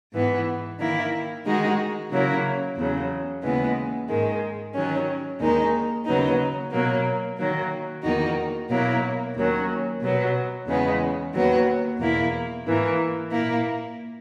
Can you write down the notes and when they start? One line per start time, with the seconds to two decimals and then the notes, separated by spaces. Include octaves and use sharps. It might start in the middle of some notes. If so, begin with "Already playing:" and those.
0.12 G#2 E3 B3
0.79 D#3 A#3 E4
1.45 D#3 G#3 D#4 F#4
2.11 C#3 F#3 A#3 E4
2.76 E2 C#3 F#3
3.42 D#2 C#3 E3 G#3 B3
4.08 G#2 D#3 G#3
4.74 D#3 F#3 C#4
5.40 D#2 D#3 G#3 D#4
6.05 D#2 C#3 F#3 B3 D#4
6.71 B2 F#3 A#3
7.37 D#3 F#3 A#3
8.03 E2 D#3 A#3 D#4 F#4
8.70 B2 F#3 A#3 E4
9.35 D#2 D#3 F#3 C#4
10.01 B2 F#3 B3
10.67 E2 C#3 G#3 B3
11.33 D#2 D#3 F#3 B3 F#4
11.98 E2 B2 A#3 E4
12.64 G#2 E3 A#3
13.31 A#2 A#3 E4